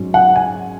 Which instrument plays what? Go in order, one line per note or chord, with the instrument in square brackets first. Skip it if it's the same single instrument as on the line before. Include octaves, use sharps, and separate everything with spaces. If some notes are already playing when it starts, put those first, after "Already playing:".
Already playing: [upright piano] G#2 F#3 C#4
F#5
G#5